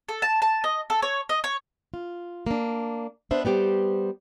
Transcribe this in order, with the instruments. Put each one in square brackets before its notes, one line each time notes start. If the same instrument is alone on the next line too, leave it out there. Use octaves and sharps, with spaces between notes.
[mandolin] A4
A5
A5
D#5
A4
C#5
D#5
C#5
[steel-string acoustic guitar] F4
A#3 D4
B3 D4 C5 E5
G3 B3 G4 C5